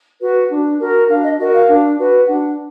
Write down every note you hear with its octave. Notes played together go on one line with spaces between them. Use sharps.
F#4 B4
D4
F#4 A#4
D4 F5
D#5
F#4 A#4 D#5
F5
D4
F#4 B4
D4 F#5